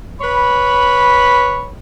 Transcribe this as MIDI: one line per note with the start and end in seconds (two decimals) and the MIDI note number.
0.21 1.71 71
0.21 1.71 73
0.21 1.71 83